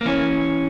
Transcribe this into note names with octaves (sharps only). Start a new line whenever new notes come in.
A#3
E3 C#4